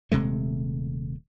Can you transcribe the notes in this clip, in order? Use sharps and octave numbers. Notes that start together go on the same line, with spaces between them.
D#1 C3 G#3 A3